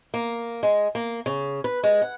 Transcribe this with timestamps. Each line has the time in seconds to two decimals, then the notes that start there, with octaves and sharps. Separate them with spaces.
0.14 A#3
0.63 G#3
0.95 A#3
1.26 C#3
1.64 B4
1.83 G#3
2.02 F#5